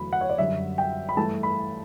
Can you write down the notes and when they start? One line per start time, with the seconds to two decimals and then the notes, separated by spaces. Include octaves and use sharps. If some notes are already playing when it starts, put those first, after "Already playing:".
Already playing: E2 D3 F#3 A3 B5
0.13 F#5
0.21 C#5
0.30 D5
0.38 F#2 D3 G3 E5
0.78 G5
1.09 B5
1.17 G2 E3 A3 A5
1.43 B5